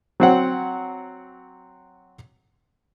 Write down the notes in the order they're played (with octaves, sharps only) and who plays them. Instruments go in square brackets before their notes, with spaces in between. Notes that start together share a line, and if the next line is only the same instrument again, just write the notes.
[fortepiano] F#3 C4 F#5